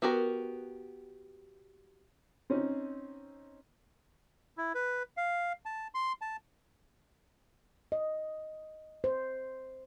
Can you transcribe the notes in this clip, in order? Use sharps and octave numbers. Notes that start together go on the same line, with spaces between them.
B3 F#4 G4 A#4
C4 C#4 D#4
E4
B4
F5
A5
C6
A5
D#5
C5